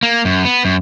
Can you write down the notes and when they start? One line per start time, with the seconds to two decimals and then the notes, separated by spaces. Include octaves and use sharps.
0.03 A#3
0.25 F#2
0.45 B3
0.65 F#2